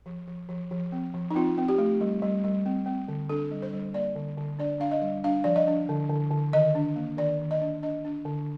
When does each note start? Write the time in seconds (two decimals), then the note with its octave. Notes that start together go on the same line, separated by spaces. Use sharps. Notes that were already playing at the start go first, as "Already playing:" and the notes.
0.06 F3
0.28 F3
0.49 F3
0.71 F3
0.92 C4
1.14 F3
1.31 D#4
1.35 C4 F4
1.58 C4
1.68 G4
1.78 A3
2.01 G3
2.22 G3
2.44 G3
2.66 C4
2.86 C4
3.08 D3
3.29 D4 A4
3.51 G3
3.62 C5
3.73 G3
3.94 A#3 D5
4.15 D3
4.38 D3
4.59 D4 D5
4.80 D4 F5
4.91 D#5
5.02 G3
5.24 D4 F5
5.44 F3 D5
5.56 D#5
5.67 D4
5.89 D3
6.09 D3
6.31 D3
6.53 D#3 D#5
6.75 D4
6.96 A#3
7.17 D#3 D5
7.39 D#3
7.51 D#5
7.62 D4
7.83 D4 D#5
8.05 D4
8.25 D3